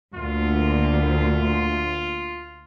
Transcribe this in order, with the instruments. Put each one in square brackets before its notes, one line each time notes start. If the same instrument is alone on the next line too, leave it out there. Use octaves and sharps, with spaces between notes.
[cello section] D2 A#2 [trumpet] F4